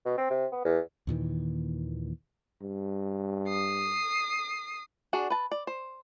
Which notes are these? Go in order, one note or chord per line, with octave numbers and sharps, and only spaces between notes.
B2
C4
C3
B3
E2
D#2 A#2 D#3 E3
G2
D#6 C7
D4 F#4 G#4
B4 A5
D5
C5